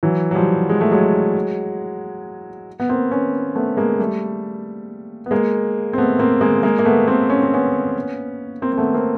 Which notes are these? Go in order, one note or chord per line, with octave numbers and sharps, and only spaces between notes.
E3 F#3
F#3
F3 G3
G#3
A3
F#3 G#3
B3
A#3 C4
B3 C#4
A3 B3
G#3 A#3
G3 A3
B3
G#3 A#3
C4
A3 B3
A#3 C4
G#3 A#3
G#3 A#3
A#3
A3 B3
A#3 C4
C#4
C4
B3 C#4
A#3 C4
C4
A3 B3
A#3 C4